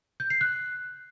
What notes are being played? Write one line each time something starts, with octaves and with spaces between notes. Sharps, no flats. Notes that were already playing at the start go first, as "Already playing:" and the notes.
G6
C7
F#6